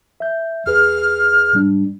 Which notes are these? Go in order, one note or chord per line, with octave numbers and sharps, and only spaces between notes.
E5 G6
E2 G#4 B4 F6
G#2 G3 D4